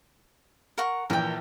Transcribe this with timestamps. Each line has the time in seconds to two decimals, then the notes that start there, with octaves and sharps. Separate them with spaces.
0.78 A#4 F#5 C#6
1.10 A#1 A#2 E3 A#4 G5